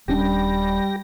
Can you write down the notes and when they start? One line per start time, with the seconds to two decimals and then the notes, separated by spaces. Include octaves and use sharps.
0.08 D#1 G3 C#4 D4 G4 A#6